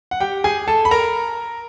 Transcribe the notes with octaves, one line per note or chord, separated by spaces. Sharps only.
F#5
G4 G5
G#4 G#5
A4 A5
B5
A#4 A#5